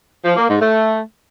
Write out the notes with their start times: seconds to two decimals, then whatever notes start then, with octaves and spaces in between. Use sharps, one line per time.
0.25 F3
0.37 A#3
0.48 G#2
0.60 A3